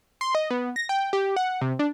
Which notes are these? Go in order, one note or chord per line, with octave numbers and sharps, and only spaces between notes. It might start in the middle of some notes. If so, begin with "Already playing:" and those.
C6
D#5
B3
A#6
G5
G4
F#5
C3
D4